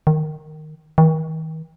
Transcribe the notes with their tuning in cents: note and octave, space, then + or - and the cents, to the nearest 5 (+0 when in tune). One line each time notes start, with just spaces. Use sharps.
D#3 -10
D#3 +40